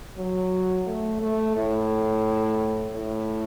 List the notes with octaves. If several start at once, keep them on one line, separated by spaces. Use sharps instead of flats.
F#3
A3
A3
A2
A2